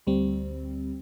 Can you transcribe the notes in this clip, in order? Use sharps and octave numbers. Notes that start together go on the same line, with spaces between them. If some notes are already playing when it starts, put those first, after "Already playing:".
D2 G3 C4